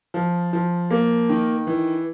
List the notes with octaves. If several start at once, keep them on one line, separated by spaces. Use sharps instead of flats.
F3
F3
A#3
D#3
E3